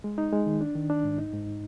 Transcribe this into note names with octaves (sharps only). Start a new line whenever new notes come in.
G#3
D#4
G#3
D#3
D4
D#3
D4
G#2
D#4
G#2